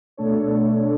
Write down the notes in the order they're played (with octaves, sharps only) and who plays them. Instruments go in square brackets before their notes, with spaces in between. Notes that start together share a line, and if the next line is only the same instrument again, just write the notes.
[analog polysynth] B2 A3 D4 A4 C#5